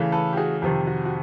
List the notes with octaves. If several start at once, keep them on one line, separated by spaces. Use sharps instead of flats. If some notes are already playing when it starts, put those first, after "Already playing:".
Already playing: C#3 E3 A3
A4 B4
G4
F#4 G#4
F2 C3 D#3 G4
F#4
F#4